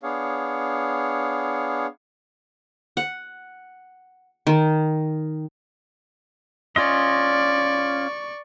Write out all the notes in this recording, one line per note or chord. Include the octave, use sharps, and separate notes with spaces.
B3 D4 G#4 C#5 F5
F#5
D#3
C#4 F4 D5 D#5 C#6